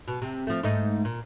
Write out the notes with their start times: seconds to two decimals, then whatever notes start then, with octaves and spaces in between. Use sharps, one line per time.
0.08 B2
0.22 C3
0.47 F3 A3
0.63 G#2 A3 D#4
1.05 A#2